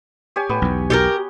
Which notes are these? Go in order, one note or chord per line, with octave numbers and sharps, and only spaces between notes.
G4 C#5 G#5
A2 B3
B1 E2
G4 A4 A#4